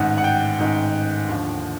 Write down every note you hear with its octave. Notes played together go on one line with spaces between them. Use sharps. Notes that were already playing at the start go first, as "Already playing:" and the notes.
Already playing: A1 G#2 D#3 F#5
F#5
G5
A1 G#2 D#3
D#2 D3 F3